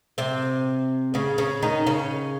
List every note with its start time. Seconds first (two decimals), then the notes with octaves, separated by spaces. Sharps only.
0.18 C3 C4
1.14 C#3 C#4
1.38 C#3 C#4
1.62 D#3 D#4
1.87 C#3 C#4